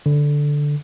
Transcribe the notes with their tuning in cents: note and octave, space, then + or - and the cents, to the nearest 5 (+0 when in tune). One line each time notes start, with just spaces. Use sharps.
D3 -5